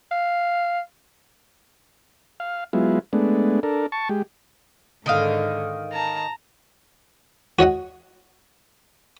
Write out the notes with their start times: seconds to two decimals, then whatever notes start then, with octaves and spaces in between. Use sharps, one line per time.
0.11 F5
2.40 F5
2.73 F#3 G#3 B3 E4 F4
3.13 G#3 A3 B3 D4
3.63 D4 A4 A#4
3.92 A5 C#6
4.09 G#3 G4
5.06 G#2 D3 D#3 D#5 F5
5.91 A5 A#5
7.59 F#4 C#5 D#5 F#5